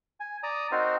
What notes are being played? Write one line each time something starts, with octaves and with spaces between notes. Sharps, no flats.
G#5
D5 A#5 D#6
C4 D#4 F#4 A#4 C5